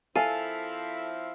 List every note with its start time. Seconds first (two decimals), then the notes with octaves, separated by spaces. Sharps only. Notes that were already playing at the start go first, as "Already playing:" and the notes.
0.16 F3 C4 E4 A4 F5 G#5